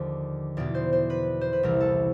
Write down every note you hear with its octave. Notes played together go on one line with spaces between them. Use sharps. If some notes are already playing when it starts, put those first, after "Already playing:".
Already playing: D#2 D3 F3 D5
E2 B2 D5
C5
C5
B4
C5
B4
C2 C3 E3 A#4
A4